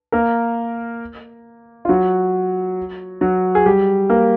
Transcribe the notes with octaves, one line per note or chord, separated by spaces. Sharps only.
A#3 A#4
F4
F#3 F#4
F#3 F#4
G#4
G3 G4
A#3 A#4